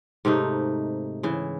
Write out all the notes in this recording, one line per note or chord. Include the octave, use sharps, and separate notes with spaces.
G#2 C3 A3 D#4
C#3 E3